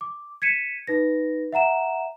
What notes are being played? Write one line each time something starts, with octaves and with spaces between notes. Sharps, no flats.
D6
G#6 B6 C#7 D#7 E7
D#4 B4 A#6
E5 F#5 A#5 E7